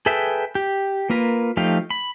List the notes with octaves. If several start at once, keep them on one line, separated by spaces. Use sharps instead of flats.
G#4 A4 B4 E5 G5
G4
A#3 F4 A#4 B4
F3 A3 D#4 G4 F5
B5